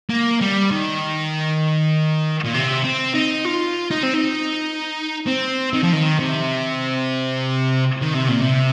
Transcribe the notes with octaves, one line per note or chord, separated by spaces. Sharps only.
A#3
G3
D#3
A#2
C3
C4
D#4
F4
D#4
C4
D#4
C4
D#3
F3
D#3
C3
D#3
C3
A#2
C3